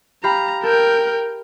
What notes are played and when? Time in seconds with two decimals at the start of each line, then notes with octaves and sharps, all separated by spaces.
0.24 G4 F5 A#5 B5
0.63 A4 A#4 G5 G6